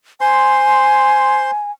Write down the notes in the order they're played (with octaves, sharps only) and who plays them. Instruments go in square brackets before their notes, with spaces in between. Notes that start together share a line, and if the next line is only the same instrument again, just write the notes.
[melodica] C5 C6 [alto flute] G#5